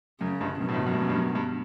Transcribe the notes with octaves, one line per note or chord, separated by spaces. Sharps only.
F#2 C#3
G1 G2
F#2 B2
A2
G1 G2
F#2
G2
F#2
G2
F#2
G2